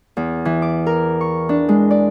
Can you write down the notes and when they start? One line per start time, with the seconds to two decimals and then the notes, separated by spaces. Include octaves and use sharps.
0.17 E2
0.45 E3
0.62 D6
0.86 A#4
1.21 C#6
1.49 D4
1.69 G#3
1.91 D5